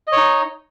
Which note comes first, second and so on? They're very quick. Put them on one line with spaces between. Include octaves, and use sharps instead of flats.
D#5 C#5 D#4